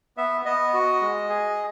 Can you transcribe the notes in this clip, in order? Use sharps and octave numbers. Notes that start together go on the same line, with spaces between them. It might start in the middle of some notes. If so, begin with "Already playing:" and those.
B3 E5
B3 D#5
F#4
G#3
G#4